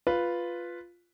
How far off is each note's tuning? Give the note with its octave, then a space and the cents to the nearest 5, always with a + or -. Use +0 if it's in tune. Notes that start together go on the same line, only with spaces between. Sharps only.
F4 +0 B4 +0